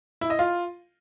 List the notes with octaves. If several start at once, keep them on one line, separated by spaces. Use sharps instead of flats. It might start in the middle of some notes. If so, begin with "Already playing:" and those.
E4
D#5
F4